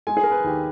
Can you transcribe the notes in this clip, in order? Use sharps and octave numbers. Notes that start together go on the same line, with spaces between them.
G#3 G#5
G#4
A#4
B4
D#2 G4